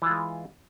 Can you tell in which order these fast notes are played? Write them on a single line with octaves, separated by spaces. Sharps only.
E3 F4 G#3